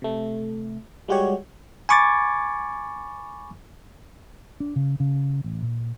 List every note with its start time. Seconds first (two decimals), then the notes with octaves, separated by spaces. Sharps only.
0.02 C3 A3
1.08 G3 G#3 F#4 G4 C#5
1.89 G#5 B5 C#6 D6 G#6 A6
4.60 D4
4.76 C#3
5.00 C#3
5.44 A1
5.63 A#2